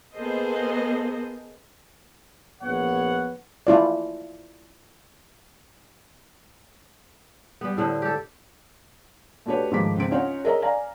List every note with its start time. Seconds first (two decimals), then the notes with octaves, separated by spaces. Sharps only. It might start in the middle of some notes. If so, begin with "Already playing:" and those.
0.16 A#3 B3 G#4 A4 C5 D#5
2.61 A#1 B3 C#5 F#5
3.67 E4 F4 D5
7.61 G3 B3
7.77 A2 D3 C4
8.02 G4 A4
9.46 A3 D4 F#4 G4 B4 C#5
9.71 G#2 D#3 F3 A3 D6 B6
9.96 C#2 C4 D7
10.11 C#4 D#4 F4 C#5 F#5
10.44 G#4 A#4 C#5 D#5 E5 A#5
10.62 D5 F5 G#5 A#5